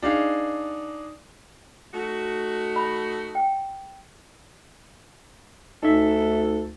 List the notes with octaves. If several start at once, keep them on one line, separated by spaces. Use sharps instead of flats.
D4 D#4 G#4 F5
A3 D#4 F#4
B5
G5
D2 C#4 D#4 A4 E5